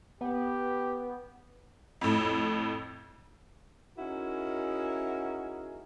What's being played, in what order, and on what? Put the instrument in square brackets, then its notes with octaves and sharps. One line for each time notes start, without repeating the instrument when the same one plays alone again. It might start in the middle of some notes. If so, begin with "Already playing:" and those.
[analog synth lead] B3 [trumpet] G4
[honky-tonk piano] F2 A2
[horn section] C#4 D#4 E4 F#4 G#4 A#4